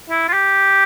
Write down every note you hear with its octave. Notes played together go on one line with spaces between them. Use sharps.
E4
F4
G4